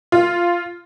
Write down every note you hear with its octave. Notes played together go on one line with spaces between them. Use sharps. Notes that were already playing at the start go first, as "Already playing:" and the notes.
F4